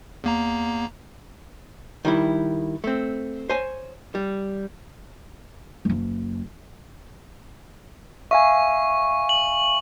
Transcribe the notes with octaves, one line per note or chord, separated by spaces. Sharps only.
E2 A#3 A#5
D#3 G3 E4
A3 C4
C5 C#5 G#5
G3
F#1 F#2
E5 F5 G#5 C#6
F#7